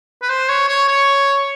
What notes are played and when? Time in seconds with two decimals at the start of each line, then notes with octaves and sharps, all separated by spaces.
0.22 B4
0.29 C5
0.49 C#5
0.68 C#5
0.88 C#5